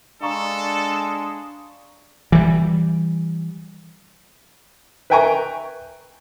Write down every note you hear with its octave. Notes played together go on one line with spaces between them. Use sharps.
G#3 D4 A4 F5 A#5 C#6
E3 G3
B4 E5 G5 G#5 A#5 C#6